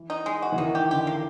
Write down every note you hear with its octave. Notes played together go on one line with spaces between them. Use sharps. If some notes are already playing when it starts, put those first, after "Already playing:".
Already playing: E3
D#4
G#3
F#4
E3
D#3 D#4
G4
D3 G4
A#3